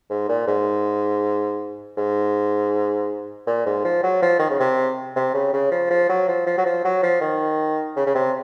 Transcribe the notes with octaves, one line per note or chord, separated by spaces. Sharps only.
G#2
A#2
G#2
G#2
A#2
G#2
F3
F#3
F3
D#3
C#3
C3
C3
C#3
C#3
F3
F3
F#3
F3
F3
F#3
F3
F#3
F3
D#3
C#3
C#3
C3